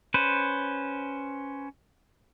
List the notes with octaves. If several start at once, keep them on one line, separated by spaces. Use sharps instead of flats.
C#4 B4 C5